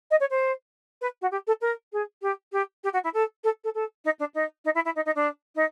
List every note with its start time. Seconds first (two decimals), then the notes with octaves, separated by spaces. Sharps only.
0.11 D#5
0.20 C#5
0.30 C5
1.01 B4
1.22 F#4
1.31 G4
1.47 A4
1.61 A#4
1.93 G#4
2.22 G4
2.52 G4
2.84 G4
2.93 F#4
3.04 E4
3.14 A4
3.44 A4
3.64 A4
3.75 A4
4.05 D#4
4.19 D4
4.34 D#4
4.65 D#4
4.75 E4
4.85 E4
4.95 D#4
5.06 D#4
5.15 D4
5.55 D#4